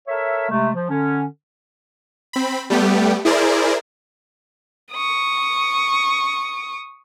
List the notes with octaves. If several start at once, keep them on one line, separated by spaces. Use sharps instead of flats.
A4 A#4 C#5 E5
C3 G#3 A3
F3
D3 C#4
C4 B5
G3 A3 B3 G4
E4 G#4 A#4 C5 D5
C#6 D#6